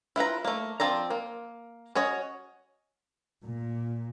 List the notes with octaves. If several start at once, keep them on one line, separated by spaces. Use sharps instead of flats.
E4 F4 B4 A#5
A3 A#3
F3 C4 D5 A#5
A#3
C#4 F#4 C#5 D#5
A#2